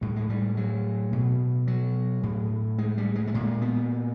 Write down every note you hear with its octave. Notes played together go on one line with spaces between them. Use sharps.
A2 G3
G#3
G3
F#3
B2
F#3
A2
G#3
G3
G#3
A3
A#2 G#3
B3